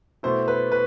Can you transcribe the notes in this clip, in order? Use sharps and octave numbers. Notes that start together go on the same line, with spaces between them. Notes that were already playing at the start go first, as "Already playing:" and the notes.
B2 A3 E4 C5
B4
B4